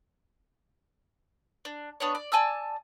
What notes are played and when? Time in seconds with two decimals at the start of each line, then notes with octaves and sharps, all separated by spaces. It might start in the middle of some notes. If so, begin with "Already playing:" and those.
1.65 D4
2.00 B3 D4 C#5
2.15 D5
2.32 D5 G#5 A5 E6